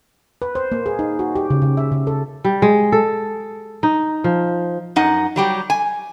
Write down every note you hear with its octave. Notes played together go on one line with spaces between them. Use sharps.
B4
C5
A#3
G#4
D#4
F#4
G4
C#3
C#3
E5
C#3
A4
G3
G#3
A4
D#4
F3
F#2 D#4 F#5
F#3 G3 G4
G#5